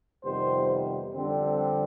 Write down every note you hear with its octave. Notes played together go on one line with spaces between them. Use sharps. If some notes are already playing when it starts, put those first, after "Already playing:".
F2 C3 D#3 G3 B3 C5
F2 D3 G3 C4